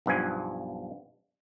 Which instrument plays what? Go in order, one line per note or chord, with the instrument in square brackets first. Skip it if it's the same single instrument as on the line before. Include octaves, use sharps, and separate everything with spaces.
[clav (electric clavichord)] B1 G2 F3 G#5